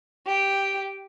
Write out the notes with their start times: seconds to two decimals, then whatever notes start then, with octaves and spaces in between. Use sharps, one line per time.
0.27 G4